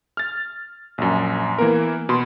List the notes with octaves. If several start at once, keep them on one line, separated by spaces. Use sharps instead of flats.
F6 A6
A#1 F#2
E3 A#3 B3 A#4
B2 B5 C6